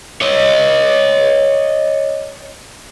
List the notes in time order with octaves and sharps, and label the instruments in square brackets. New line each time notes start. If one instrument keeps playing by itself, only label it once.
[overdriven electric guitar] C#5 D#5